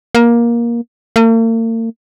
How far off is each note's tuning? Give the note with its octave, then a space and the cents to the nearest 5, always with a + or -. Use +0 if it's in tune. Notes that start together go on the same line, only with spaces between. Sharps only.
A#3 +15
A#3 -45